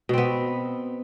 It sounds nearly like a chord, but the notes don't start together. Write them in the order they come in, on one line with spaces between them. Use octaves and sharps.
B2 C4 B3